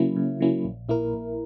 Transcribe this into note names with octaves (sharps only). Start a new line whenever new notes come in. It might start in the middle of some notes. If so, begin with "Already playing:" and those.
Already playing: C#3 F#3 A#3 C#4 E4
C#3
F#3 A#3 C#4 E4
A#1
A#2 A#3 E4 A#4
A#1